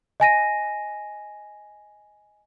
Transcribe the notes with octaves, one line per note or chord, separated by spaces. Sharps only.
D#5 G#5 A#6 D#7